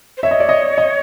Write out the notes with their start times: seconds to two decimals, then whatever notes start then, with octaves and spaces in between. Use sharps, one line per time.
0.17 C5
0.23 C#5 E5
0.31 D#5
0.40 D5
0.49 D#5
0.78 D#5